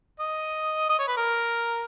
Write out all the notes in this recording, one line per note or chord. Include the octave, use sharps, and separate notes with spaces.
D#5
D#5
C#5
B4
A#4